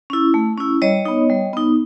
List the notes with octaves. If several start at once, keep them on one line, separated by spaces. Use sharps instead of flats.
C#4 E4
A3
C#4 E4
G3 C#5 D#5
B3 D#4
G3
B3 D#4